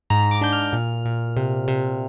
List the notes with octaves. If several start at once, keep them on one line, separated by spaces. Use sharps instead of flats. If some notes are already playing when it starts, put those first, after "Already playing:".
G#2 A#5
D6
D4 G6
F6
A#2
A#2
C3
C3